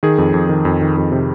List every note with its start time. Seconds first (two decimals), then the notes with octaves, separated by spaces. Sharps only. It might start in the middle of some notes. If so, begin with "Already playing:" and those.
0.03 D#3 G#4
0.18 F2
0.34 F2
0.49 D#3
0.65 F2
0.81 D#3
0.97 F2
1.12 C3